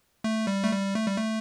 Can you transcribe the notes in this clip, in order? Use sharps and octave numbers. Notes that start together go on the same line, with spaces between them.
A3
G3
A3
G3
A3
G3
A3